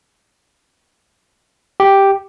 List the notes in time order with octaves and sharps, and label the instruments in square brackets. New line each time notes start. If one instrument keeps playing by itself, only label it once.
[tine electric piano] G4